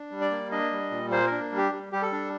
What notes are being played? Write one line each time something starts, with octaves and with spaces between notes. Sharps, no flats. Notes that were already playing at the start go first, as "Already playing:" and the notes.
Already playing: D4
G3
D5
A#3
D4 D#5
G3
A#2
A#3 C5
D4 A#4
G3
G4
G3
G3 G4
A4
D4